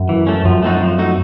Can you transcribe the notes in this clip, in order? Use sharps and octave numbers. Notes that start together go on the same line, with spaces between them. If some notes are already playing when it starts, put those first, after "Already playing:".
Already playing: F#2
E3
A3 C#4
F#2 F3
A3 C4 D#4 F#4
F3
A3 C4 D#4 F#4